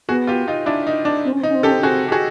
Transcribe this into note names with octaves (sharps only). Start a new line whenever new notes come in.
B3 F#4 G#4
F4 G4
D#4 F4
D4 E4
D#4
D4
C4
C#4
C4 D#4
C#4
C4
C#4 G4 A4
C4
C#4
F#4 G#4
C4
G4
F#4 G#4